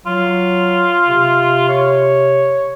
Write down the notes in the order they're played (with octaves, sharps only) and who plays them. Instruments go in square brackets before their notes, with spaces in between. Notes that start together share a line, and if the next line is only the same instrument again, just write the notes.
[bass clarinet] F#3 [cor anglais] F4
[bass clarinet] C3
[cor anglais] C#5